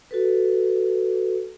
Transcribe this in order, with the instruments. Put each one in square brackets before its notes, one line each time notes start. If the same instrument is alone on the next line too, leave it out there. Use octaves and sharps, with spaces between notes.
[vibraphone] F#4 A4 B4